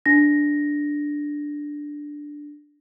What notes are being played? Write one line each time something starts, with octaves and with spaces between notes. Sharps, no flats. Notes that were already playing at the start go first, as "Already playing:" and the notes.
D4 A#6